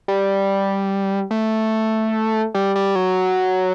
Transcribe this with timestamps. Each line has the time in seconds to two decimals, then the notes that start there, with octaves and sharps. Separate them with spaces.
0.08 G3
1.31 A3
2.55 G3
2.76 G3
2.95 F#3